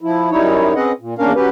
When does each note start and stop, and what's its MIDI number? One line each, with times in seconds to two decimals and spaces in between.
0.01 0.31 53
0.01 0.31 64
0.31 0.73 42
0.31 0.73 55
0.31 0.73 63
0.31 0.73 64
0.31 0.73 73
0.75 0.92 60
0.75 0.92 61
0.75 0.92 68
0.75 0.92 71
0.75 0.92 75
0.75 0.92 78
1.00 1.14 46
1.19 1.33 40
1.19 1.33 58
1.19 1.33 61
1.19 1.33 62
1.19 1.33 70
1.19 1.33 77
1.35 1.49 54
1.35 1.49 61
1.35 1.49 67
1.35 1.49 71